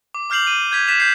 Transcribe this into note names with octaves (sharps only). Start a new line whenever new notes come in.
D6
D6 F6 G6 C7 F7 F#7
D#7
G6 G#6 B6 F7
F#6 A6 B6 E7 F7
G6 C7